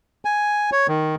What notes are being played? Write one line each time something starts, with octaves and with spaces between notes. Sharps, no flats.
G#5
C#5
D#3